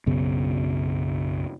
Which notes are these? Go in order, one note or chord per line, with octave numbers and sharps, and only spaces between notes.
B1 F#2 C#3 B3